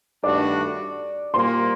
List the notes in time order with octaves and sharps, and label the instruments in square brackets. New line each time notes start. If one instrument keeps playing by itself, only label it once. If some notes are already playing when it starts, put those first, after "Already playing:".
[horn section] G2 D#3 A3 D4 F#4 [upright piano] D5 D6
[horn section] A#2 G3 A#3 [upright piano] C5 C6